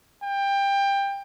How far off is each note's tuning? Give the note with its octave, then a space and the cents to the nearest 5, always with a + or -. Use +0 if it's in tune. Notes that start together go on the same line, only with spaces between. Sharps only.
G5 +20